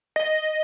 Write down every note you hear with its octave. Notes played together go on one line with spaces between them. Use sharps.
D#5